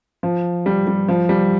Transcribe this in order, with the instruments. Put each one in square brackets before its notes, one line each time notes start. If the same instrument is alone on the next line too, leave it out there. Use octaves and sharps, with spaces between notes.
[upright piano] F3
G3
G3
F3
G3